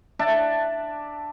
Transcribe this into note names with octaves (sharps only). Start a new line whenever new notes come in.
D4 D5 E5 A5